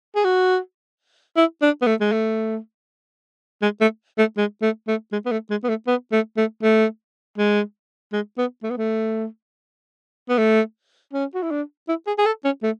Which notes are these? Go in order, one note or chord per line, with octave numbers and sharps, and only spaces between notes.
G#4
F#4
E4
D4
B3
A3
G#3
A3
G#3
A3
A3
G#3
A3
A3
G#3
B3
A3
G#3
B3
A3
B3
A3
A3
A3
G#3
G#3
B3
A3
B3
A3
B3
A3
C#4
F#4
E4
D4
E4
G#4
G#4
A4
C#4
A3